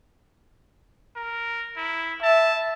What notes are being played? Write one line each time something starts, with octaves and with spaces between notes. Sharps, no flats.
A#4
E4
E5 A5